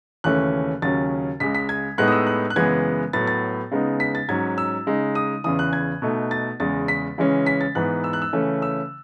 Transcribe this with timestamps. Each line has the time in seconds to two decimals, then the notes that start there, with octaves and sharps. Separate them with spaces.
0.24 D#2 C#3 E3 A3 C#4 F#6
0.82 D#2 C#3 F#3 C#4 A6
1.40 C#2 C#3 G#3 B6
1.55 B6
1.69 G#6
1.98 A2 G#3 B3 D#4 F#6
2.08 D#6
2.12 E6
2.27 F#6
2.50 F#6
2.56 F#2 C#3 E3 G#3 B3 G#6
3.13 A2 F#3 B3 A6
3.27 A6
3.72 C#3 G#3 B3 D#4
4.00 B6
4.15 A6
4.28 G#2 F#3 C#4 G#6
4.58 E6
4.87 C#3 G#3 D#4
5.15 D#6
5.44 E2 C#3 E3 D#6
5.59 F#6
5.73 G#6
6.02 B2 A3 D#4
6.31 A6
6.60 E2 C#3 G#3 A6
6.88 B6
7.18 C#3 E3 G#3 C#4
7.46 B6
7.61 A6
7.75 G#2 E3 B3 F#6
8.04 E6
8.13 F#6
8.22 E6
8.33 C#3 E3 A3 C#4
8.62 E6